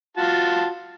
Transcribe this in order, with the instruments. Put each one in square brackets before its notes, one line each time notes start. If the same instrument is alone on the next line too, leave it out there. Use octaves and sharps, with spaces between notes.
[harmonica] F4 F#4 A5